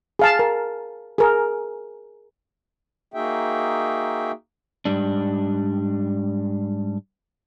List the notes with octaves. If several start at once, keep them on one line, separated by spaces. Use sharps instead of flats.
G#4 F5 A5
A#4
G#4 A#4
A#3 D#4 F#4 G#4 E5 G5
G#2 G3 D4